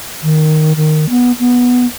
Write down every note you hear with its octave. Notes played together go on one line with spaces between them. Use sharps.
D#3
D#3
B3
B3